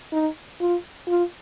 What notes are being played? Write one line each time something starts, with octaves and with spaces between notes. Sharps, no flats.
D#4
F4
F4